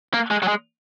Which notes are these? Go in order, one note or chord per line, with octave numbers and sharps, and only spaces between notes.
A#3
G#3
F#3
G#3